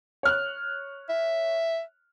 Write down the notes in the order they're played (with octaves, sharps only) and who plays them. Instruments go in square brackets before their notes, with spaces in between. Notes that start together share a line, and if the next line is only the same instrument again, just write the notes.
[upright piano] C#5 F6 F#6
[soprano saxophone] E5